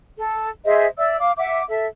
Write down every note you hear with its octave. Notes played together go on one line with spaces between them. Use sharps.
A4
G#4 C5 D#5 E5
D5 E5 E6
F5 D6
E5 F#5 D6
A4 E5